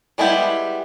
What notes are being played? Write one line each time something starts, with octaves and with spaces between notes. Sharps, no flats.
G3 G#3 B3 E4 G4